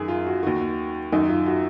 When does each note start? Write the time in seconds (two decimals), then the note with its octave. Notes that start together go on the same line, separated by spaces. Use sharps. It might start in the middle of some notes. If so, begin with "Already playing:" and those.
Already playing: F#2 D#3 G#4 A#4
0.08 F4
0.27 F#4
0.43 D#2 D#3 F#4
1.12 F#2 D#3 D#4
1.29 F4
1.46 F#4